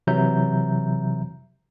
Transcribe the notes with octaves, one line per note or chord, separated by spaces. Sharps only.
C3 E3 F#3 E5 A#5 G6